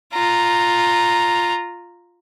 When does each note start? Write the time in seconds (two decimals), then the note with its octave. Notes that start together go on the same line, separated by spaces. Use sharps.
0.14 F4 A#5